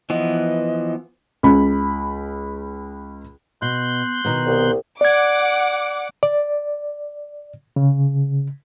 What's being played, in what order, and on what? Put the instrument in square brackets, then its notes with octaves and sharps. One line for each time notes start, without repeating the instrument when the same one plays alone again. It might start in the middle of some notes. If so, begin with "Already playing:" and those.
[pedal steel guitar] E3 F3 B3 [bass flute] D#5
[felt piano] C#2 B5
[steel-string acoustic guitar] B2 [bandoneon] C6 F#6 G6
[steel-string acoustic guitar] B2 D#3 B3
[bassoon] C2
[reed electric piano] D5 G#6 [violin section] F#5 D6
[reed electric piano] D5
C#3